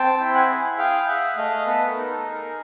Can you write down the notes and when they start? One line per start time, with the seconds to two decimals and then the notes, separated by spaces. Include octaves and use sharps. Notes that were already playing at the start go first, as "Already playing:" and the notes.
Already playing: C4 G5 A5
0.20 E4
0.34 F#5 G#5
0.50 G#4
0.78 G#4 F5 G5
1.08 G#4 E5 F#5
1.37 A3 D#5 F5
1.66 B3 A4 B4
1.88 A#4
1.96 D#4
2.11 A4
2.25 G#4
2.33 A#4